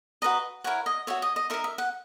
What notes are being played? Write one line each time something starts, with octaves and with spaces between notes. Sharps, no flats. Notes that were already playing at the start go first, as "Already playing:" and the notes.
F#4 B4 D#5 A#5
E4 A#4 C#5 F#5
D#5
F#4 C#5 E5
D#5
D#5
D#4 A#4 D#5 E5
E5
F#5